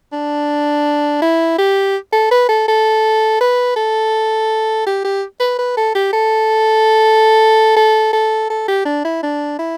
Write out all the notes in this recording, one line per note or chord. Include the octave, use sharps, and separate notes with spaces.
D4
E4
G4
A4
B4
A4
A4
B4
A4
G4
G4
B4
B4
A4
G4
A4
A4
A4
A4
G4
D4
E4
D4
E4